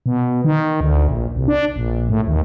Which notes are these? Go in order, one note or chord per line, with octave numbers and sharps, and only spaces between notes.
B2
D#3
D2
A#1
C2
D4
A#1
A2
D#2